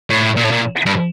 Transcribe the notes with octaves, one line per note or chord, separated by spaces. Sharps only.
A2
A#2
A2
A#2
G2